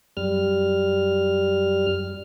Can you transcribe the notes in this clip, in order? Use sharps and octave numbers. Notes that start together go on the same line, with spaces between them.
F#2 G3 F6